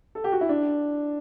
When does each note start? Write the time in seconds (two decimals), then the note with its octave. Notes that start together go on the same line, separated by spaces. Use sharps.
0.15 A4
0.24 G4
0.32 F#4
0.41 E4
0.49 D4